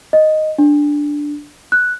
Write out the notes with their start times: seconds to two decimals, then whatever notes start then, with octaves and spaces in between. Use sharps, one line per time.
0.13 D#5
0.58 D4
1.72 F#6